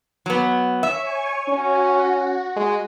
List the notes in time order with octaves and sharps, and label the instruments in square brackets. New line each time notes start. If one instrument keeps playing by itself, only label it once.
[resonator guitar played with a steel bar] F#3 B3
[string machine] C#5 G#5 C#6 [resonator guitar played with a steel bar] E5
[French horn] C#4 [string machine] F#4
[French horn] G#3